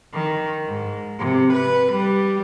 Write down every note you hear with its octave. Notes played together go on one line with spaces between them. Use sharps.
D#3
G#2
C3
B4
G3